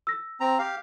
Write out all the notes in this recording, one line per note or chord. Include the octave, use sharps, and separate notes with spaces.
E6 A#6
C4 A#5
G4 F5